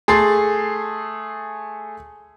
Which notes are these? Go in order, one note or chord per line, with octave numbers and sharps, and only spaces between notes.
A3 G#4 A4 C6 A6 C7